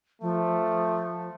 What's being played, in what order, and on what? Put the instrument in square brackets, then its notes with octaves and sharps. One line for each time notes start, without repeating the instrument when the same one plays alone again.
[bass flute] F3 [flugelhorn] A3